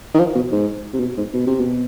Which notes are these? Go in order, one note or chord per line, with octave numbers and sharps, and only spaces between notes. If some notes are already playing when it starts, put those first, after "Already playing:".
D#3
F3
B2
G#2
C3
B2
G#2
B2
C3
B2